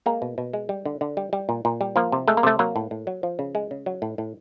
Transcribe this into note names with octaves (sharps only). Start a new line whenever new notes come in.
G#3 A#3
B2
B2
G#3
G3
D3
D3
G3
G3
A#2
A#2
G3
F3 A#3
C3
G#3 A3
A#3
C3 A3
F#3 A#3
A2
A2
F#3
F3
C#3
G#3
C#3
F#3
A2
A2